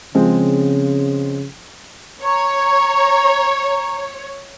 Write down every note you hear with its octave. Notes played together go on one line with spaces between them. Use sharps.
C#3 F3 G#3 C4
C#5 A#5 C#6